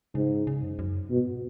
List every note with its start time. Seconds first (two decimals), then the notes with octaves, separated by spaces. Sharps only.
0.15 G#2 C#3
0.47 C#3
0.63 F#2
0.79 F#2
1.11 G#2 B2